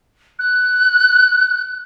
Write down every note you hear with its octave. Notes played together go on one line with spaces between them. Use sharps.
F#6